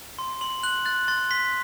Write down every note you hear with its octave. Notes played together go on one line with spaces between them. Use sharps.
C6
C6 F#7
F#6 F#7
F#6 A6
C6 A6
C6 B6